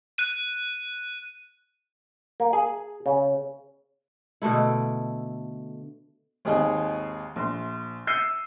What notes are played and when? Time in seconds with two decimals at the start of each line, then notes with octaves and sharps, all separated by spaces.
0.18 F#6 D#7
2.40 A#3
2.53 G#4
3.06 C#3
4.42 B2 D3 A3 E4
6.45 G#1 D#2 G#4 D#5
7.36 A#1 C6
8.07 E6 G6 C7 C#7 D#7